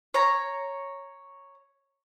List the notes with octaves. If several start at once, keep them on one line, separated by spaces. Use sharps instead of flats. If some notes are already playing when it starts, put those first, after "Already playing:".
C#5 A#5